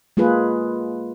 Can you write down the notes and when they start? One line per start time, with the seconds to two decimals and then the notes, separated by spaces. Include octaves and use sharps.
0.17 G#3 A#3 F4 G#4 B4